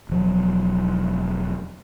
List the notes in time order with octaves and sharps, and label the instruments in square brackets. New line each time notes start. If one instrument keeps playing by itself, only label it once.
[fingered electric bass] E1 F3 F#3